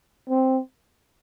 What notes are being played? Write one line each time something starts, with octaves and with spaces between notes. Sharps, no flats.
C4